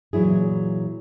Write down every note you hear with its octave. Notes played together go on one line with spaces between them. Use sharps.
A#2 E3 F#3 E4 G#4